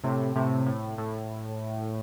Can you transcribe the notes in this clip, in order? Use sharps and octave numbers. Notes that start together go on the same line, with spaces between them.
A2 C3
A2 C3
A2
A2